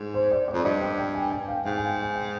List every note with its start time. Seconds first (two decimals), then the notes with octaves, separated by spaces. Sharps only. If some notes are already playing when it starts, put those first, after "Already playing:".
Already playing: G#2
0.14 C5
0.31 D5
0.48 D5
0.54 F2
0.64 G2 D#5
0.81 G5
0.98 G5
1.15 G#5
1.32 G5
1.48 F5
1.65 G#2 G5
1.77 G#5
2.03 G#5
2.16 G5